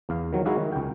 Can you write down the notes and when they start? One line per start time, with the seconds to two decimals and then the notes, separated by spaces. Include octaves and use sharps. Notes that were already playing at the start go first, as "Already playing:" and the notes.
0.09 E2 F5
0.33 D#3 F#3
0.45 G#3 D#4 E4 F#4 G#4 F5
0.58 D#3
0.72 C#2 G5